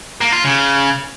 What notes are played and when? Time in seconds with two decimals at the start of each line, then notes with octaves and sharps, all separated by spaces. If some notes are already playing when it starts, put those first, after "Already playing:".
0.21 A#3
0.33 F4
0.44 C#3